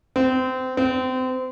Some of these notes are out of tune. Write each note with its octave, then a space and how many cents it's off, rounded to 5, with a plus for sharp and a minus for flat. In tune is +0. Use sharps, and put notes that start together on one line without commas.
C4 -25
C4 -30